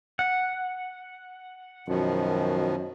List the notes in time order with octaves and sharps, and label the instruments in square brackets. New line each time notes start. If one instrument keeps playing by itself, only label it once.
[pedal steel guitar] F#5
[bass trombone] F#2 [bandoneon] B2 D#3 F3